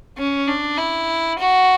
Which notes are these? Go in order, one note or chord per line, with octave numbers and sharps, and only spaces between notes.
C#4
D4
E4
F#4